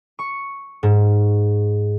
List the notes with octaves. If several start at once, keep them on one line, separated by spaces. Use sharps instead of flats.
C#6
G#2